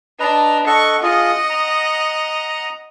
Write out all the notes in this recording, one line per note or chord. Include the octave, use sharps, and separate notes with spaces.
D4 B4 D#5 A#5
A4 D#5 F#5 C#6
F4 G#4 D#5 F#5
A#5